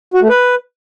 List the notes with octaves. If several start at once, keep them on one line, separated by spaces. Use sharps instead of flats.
F#4
A3
B4